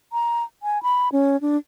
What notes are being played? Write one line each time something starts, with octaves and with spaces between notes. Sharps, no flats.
A#5
G#5
B5
C#4
D4